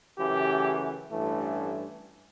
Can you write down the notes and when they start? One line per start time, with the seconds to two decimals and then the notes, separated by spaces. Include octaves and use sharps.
0.17 F#2 C#3 E3 A3 G4
1.11 A1 G2 E3 A3